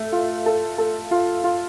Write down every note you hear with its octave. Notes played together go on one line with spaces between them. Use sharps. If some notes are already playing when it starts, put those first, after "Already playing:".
Already playing: A3
F4
A4
A4
F4
F4